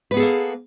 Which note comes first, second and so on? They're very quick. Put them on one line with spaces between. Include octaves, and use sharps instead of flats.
B4 B3 G#4 A4 A#3